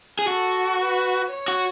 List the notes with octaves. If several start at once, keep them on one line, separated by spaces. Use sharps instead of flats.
G#4
F#4 A4
B4
C#5
F#4